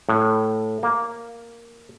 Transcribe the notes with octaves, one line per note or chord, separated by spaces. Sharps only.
A2
A#3